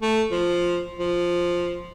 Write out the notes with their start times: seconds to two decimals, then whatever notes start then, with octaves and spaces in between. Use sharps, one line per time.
0.02 A3
0.31 F3
0.99 F3